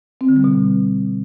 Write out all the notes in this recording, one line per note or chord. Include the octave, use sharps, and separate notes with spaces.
C4
D3
G3
B2